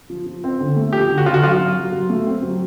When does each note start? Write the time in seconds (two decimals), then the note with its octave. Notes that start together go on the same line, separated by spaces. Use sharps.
0.10 F3
0.26 F3
0.44 C4
0.60 D3
0.76 A3
0.93 F3 G4
1.09 D3
1.18 F#4
1.26 D3 F4
1.34 F#4
1.43 F#3 F4
1.59 F#3
1.76 F#3
1.92 F#3
2.10 A3
2.26 C4
2.43 F#3